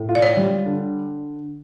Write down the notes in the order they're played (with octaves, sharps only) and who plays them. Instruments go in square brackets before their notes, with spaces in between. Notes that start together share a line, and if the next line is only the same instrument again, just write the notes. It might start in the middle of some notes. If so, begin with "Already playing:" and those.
Already playing: [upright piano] A2
F4
[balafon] D5
C#5
[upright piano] G3
D3